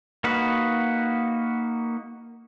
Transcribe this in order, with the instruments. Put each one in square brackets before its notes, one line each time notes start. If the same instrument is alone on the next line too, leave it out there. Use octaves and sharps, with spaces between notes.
[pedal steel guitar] A#3 D#4 F#4 B4